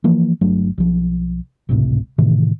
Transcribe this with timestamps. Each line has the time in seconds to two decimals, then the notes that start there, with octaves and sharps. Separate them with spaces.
0.04 E3 F3 A#3
0.41 G1 F#3 A3 D4
0.78 B1 F3
1.69 G#1 C#2 A2 C3
2.18 A2 C3 D#3 E3